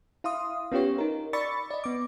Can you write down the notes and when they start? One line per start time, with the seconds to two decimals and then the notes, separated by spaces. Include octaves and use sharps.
0.24 E4 F5 C6 D#6
0.72 B3 C#4 F4 G4 C#5
0.98 D#4 A#4
1.33 D5 B5 C#6 E6 A6 C#7
1.71 D5 D#5
1.84 B3 D6